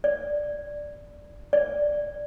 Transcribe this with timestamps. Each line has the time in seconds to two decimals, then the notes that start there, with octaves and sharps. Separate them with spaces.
0.04 D5
1.53 D5